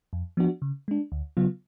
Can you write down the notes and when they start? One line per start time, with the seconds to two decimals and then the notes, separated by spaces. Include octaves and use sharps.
0.13 F2
0.37 F3 B3 D4 F#4
0.62 C#3
0.88 G#3 D4
1.12 D2
1.37 C#3 F#3 B3 F4